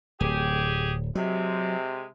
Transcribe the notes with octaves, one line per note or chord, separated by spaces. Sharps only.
D1 G4 G#4
C3 F#3 G#3